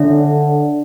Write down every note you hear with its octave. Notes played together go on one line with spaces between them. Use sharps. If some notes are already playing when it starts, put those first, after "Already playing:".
Already playing: D3 D4 A4 C#5 E5